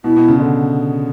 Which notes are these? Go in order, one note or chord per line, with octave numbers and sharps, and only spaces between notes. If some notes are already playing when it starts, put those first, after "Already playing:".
B2 E4
B2
C#3
D3